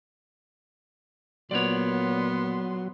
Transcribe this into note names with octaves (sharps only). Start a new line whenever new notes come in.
A#2 F#3 B3 C#5 D5 C6